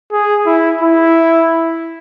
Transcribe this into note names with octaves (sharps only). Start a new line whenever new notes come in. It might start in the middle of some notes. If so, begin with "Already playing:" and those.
G#4
E4
E4